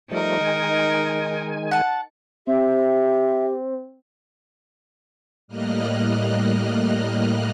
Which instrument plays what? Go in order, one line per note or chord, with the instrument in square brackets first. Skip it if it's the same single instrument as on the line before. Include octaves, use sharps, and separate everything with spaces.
[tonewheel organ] F3 G3 A3 [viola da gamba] D#4 A#4
[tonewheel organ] D#3 G#3 G#5
[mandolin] F#5 A5
[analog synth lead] C4 [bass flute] G4 [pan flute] E5
[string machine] A2 G3 A#3 D#5 F6 F#6